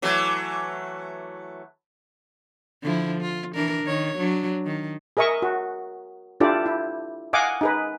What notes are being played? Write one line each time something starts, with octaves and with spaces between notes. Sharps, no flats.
E3 F#3 A3
D3 F3 E4
F4
E3 D4 A#4
D#3 C#5
F#3 D4
D#3
G#4 A#4 D#5 E5 C#6
F#4
D4 E4 F4 G4 A4 D5
E4
D#5 F5 F#5 G#5 D6
D#4 G#4 B4